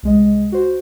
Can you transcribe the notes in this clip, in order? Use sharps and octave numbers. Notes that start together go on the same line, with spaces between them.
C2 G#3 D#5
F#4 C5